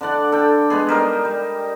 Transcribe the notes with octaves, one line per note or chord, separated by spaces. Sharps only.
D3 D4 D5 F#5
A4 G5
G#3 B3 G#4
G3 D#4 A#4
G3